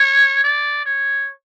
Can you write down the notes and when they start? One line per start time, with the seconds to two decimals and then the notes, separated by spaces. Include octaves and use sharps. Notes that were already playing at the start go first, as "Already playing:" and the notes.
Already playing: C#5
0.44 D5
0.86 C#5